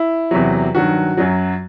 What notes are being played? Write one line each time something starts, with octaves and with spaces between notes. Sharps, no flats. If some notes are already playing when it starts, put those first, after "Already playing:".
Already playing: E4
E2 C3 F#3
G2 D#3 F#3 F#4
F#2 F#3